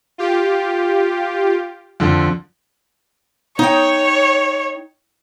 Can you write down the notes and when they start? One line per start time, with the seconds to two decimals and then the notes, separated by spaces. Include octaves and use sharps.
0.18 F4 G4
2.00 F2 D3
3.59 D#4 C#5 G5